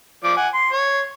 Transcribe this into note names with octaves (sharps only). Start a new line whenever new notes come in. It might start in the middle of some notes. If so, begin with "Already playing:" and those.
F3 D5 D6
F#5 G#5
C6
C#5